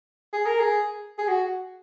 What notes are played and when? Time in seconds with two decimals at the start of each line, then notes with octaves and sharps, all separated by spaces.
0.33 G#4
0.46 A#4
0.60 G#4
1.18 G#4
1.28 F#4